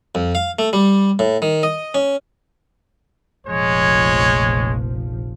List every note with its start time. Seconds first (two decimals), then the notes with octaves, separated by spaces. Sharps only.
0.15 F2
0.35 F5
0.59 A3
0.73 G3
1.19 A2
1.42 D#3
1.63 D#5
1.94 C#4
3.47 F1 A#1 F3 G#3 C#5